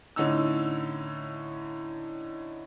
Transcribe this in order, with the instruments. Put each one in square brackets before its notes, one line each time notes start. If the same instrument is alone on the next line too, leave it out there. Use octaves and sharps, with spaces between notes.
[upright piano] A2 D3 C#4 D#4 E6